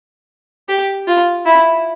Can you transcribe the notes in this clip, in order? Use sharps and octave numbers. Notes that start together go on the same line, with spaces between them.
G4
F4
E4